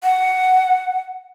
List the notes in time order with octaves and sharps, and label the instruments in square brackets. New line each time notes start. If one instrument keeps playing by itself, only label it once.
[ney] F#5